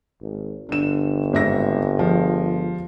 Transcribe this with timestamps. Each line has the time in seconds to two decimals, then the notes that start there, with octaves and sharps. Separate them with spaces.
0.21 G#1
0.69 G1 D3 E7
1.33 G#1 E5 A#6
1.97 F3 G#3